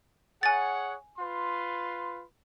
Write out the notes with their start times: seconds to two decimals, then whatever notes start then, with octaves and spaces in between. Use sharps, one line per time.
0.43 G#4 C#5 F#5 G#5 A6
1.19 F4 B4 C6